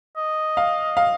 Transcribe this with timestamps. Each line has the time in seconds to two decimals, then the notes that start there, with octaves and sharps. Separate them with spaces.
0.17 D#5
0.57 F5
0.97 F5